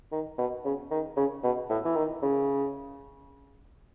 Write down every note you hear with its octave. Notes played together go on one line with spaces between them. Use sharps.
D#3
B2
C#3
D#3
C#3
B2
A2
E3
D#3
C#3